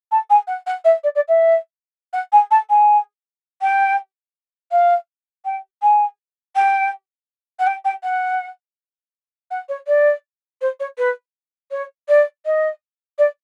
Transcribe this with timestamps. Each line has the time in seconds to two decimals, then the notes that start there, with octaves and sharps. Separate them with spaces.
0.12 A5
0.30 G#5
0.48 F#5
0.67 F#5
0.85 E5
1.04 D5
1.15 D5
1.29 E5
2.13 F#5
2.33 G#5
2.51 A5
2.70 G#5
3.62 G5
4.72 F5
5.45 G5
5.82 G#5
6.56 G5
7.60 F#5
7.67 G5
7.85 G5
8.03 F#5
9.51 F#5
9.69 C#5
9.87 D5
10.62 C5
10.80 C#5
10.98 B4
11.71 C#5
12.09 D5
12.46 D#5
13.19 D5